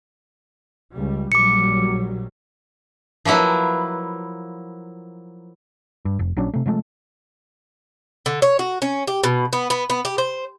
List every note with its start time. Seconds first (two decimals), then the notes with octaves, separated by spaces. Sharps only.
0.93 C#2 G3
1.32 A#1 F#3 G3 D6 C#7
3.25 F3 F#3 A#3 E4 B4
6.05 G2
6.19 F1
6.36 A#1 F#3 C#4 D4
6.54 C3 A3
6.66 C3 F3 G#3 A3
8.26 D3
8.42 C#5
8.59 F#4
8.82 C#4
9.07 G4
9.24 B2
9.53 B3
9.70 B3
9.90 B3
10.05 G4
10.18 C5